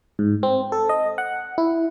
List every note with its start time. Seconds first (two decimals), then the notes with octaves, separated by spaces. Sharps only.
0.19 G#2
0.43 C4
0.72 A4
0.89 D#5
1.18 F#5
1.58 E4